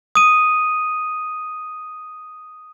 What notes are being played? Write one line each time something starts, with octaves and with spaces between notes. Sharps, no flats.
D#6 D#7